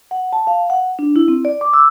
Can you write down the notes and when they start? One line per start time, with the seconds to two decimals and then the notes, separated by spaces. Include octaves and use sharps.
0.11 F#5
0.33 A5
0.47 F5
0.70 F#5
0.99 D4
1.16 E4
1.28 C4
1.45 D5
1.61 D6
1.73 E6